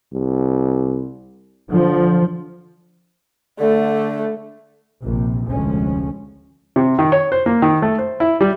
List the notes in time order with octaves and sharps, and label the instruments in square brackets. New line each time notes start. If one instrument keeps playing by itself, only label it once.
[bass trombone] C2
[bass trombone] D3 [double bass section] F3
[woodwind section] D3 [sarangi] A3
[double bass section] A#1 C3
F1 D2 F3 G#3 C#4
[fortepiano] C3
D#3
C#5
C5
A#3
D#3
A3
C5
E4
G3